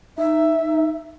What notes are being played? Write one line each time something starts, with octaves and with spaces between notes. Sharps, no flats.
D#4 E5